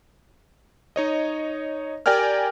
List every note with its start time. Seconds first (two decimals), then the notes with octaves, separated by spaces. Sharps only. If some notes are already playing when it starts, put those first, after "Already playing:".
0.96 D#4 C#5 D#5
2.06 G4 A#4 D5 G5 G#5 F6